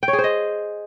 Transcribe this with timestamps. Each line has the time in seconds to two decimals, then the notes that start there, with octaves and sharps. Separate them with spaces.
0.03 G5
0.08 C#5
0.13 G#4
0.19 C5
0.24 D#5